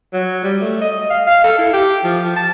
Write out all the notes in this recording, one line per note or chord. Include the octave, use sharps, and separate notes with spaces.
F#3
G3
A3
D#5
F5
F5
A4
E4
G4
F3
F3
A5